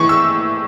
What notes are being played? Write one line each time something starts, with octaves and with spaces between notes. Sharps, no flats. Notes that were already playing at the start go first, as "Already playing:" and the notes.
Already playing: A2 E3 C#6
E6